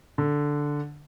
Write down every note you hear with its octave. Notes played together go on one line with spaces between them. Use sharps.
D3